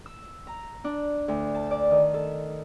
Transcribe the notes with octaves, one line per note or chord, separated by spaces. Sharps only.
E6
A#5
D4
D2
A5
D5
D#3
A4